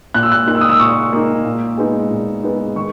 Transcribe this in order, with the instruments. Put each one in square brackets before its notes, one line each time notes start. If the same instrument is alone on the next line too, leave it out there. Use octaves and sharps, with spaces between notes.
[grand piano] A#2 F#6
E6
F#6
A#3 D#4 F#6
E6
D#6
E6
A#2 C#6
A#3 D#4
A#2
G#3 B3 D#4
A#2
G#3 B3 D#4
D#3 C#6